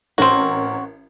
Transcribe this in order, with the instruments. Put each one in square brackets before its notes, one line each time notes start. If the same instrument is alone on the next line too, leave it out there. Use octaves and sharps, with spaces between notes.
[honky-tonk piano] A1 A#4 C#5 [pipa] C4 F#4